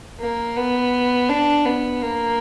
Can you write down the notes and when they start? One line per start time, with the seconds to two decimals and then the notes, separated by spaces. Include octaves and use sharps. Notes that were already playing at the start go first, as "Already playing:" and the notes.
0.20 A#3
0.57 B3
1.29 D4
1.66 B3
2.03 A#3